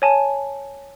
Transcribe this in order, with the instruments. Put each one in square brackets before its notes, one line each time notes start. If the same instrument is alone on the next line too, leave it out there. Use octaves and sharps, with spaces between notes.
[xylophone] C#5 G#5 A5